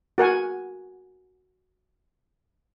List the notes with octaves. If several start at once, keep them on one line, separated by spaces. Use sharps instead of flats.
F#4 A#4 F#5 G#5